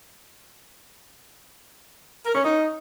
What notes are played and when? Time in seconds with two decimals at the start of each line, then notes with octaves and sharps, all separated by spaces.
2.26 A#4
2.35 C#4
2.44 D#4